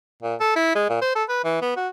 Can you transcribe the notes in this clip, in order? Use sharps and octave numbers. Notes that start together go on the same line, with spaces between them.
A#2
A4
E4
G#3
A#2
C5
A4
B4
E3
B3
F#4